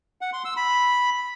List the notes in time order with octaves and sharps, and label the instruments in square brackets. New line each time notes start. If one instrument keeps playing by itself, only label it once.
[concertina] F#5
C6
E6
B5